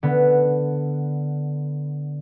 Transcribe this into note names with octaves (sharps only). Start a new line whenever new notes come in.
D3 B3